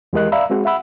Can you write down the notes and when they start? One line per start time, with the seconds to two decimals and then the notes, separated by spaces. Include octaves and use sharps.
0.13 E2 G#3 G4 A#4 D#5 F#6
0.32 D5 E5 F5 A#5 B5 E6
0.50 G#3 C4 F#4 G#4
0.65 E5 F#5 B5 E6